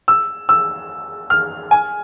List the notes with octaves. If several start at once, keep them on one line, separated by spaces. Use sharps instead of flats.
E6
E6
F6
G#5